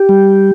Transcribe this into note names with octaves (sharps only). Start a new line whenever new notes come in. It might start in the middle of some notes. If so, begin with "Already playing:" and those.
Already playing: G4
G3